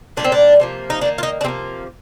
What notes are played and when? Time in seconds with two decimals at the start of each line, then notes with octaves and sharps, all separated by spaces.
0.17 A#2 G3 A#3 D4
0.24 C4
0.32 D4
0.60 C3 F3 A#3
0.90 D#4
1.01 D#3 A#3 D4
1.18 F4
1.23 D#4
1.41 D4
1.44 C3 F3 A#3 C4